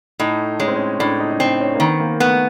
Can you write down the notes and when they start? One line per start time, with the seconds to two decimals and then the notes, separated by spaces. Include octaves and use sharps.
0.20 A2 D#4
0.60 G#3 C#4
0.68 C4
0.76 C#4
0.99 A2 D4
1.20 D#4
1.31 D#4
1.40 C4 D4
1.60 C#4
1.75 A#3
1.80 D#3 B3
2.00 A#3
2.20 A3 B3